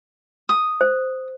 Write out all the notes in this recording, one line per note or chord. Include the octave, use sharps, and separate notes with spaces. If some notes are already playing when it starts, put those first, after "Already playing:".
D#6
C5